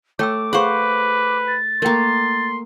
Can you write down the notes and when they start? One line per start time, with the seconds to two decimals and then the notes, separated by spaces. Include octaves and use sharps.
0.19 A3 C#5 G5 D6 E6
0.53 G#4 B4 C5 F5 F#5 C#6
1.47 A6
1.82 A3 A#3 A#4 G5 C6